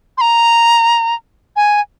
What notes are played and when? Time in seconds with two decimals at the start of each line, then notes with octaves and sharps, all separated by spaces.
0.18 C6
0.21 A#5
1.56 G#5